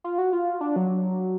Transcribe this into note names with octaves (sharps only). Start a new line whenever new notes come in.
F4
F#4
F4
D4
F#3